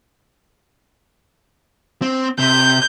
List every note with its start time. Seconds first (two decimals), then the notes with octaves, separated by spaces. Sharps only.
2.02 C4
2.39 C3 G6